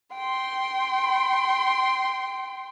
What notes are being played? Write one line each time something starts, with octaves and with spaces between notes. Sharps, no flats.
G5 C6